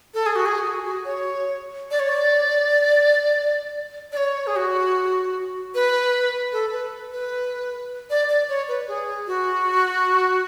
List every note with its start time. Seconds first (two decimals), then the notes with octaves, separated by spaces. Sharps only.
0.14 A4
0.26 G#4
0.36 F#4
0.46 G#4
0.65 F#4
0.84 F#4
1.05 C#5
1.91 D5
2.00 C#5
2.09 D5
4.12 D5
4.17 C#5
4.47 G#4
4.56 F#4
5.75 B4
6.52 A4
6.72 B4
7.12 B4
8.10 D5
8.29 D5
8.49 C#5
8.68 B4
8.88 G#4
9.27 F#4